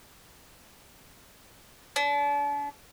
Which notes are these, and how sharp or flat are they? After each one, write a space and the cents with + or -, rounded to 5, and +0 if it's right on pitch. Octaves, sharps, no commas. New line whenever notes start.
D4 -40